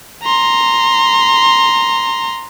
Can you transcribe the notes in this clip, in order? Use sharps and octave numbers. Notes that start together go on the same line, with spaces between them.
A#5 C6